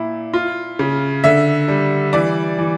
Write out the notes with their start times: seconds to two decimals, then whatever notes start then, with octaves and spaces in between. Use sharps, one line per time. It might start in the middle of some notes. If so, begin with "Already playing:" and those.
Already playing: A#2 E4
0.34 F4
0.79 C#3
1.24 D3 E5
1.68 G3
2.13 E3 D5
2.58 E3